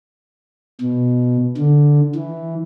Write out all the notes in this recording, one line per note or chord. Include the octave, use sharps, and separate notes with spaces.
B2
D3
E3